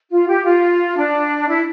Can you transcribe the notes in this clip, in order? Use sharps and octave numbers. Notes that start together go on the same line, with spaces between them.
F4
G4
F4
D4
E4